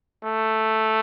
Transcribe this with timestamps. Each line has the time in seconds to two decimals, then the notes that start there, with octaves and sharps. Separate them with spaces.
0.24 A3